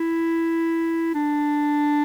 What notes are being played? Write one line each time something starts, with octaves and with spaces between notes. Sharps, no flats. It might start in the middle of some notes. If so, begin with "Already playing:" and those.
Already playing: E4
D4